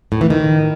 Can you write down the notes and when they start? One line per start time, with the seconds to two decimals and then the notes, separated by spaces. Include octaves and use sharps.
0.12 A2
0.21 E3
0.30 D#3